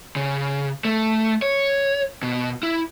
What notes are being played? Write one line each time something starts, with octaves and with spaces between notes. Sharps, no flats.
C#3
A3
C#5
B2
E4